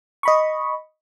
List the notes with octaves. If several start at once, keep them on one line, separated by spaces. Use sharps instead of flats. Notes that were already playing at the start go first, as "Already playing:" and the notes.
D#5 B5 C#6